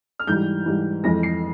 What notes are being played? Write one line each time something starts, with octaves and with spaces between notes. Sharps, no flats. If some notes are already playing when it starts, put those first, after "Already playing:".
F6
G#2 E3 G3 G6
G#2 E3 G3
F2 E3 G#3 A#6
C7